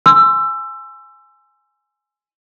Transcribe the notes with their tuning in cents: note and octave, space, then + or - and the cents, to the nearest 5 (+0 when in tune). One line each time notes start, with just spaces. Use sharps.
G#5 +0 C6 -5 E6 +20